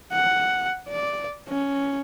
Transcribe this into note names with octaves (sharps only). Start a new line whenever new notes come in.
F#5
D5
C#4